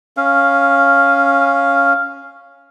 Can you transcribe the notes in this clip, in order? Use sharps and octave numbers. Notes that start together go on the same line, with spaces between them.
C#4 F5